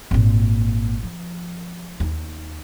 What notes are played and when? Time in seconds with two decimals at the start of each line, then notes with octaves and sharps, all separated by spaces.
0.11 G#1 A#2
1.03 F3
2.00 D#2 D#4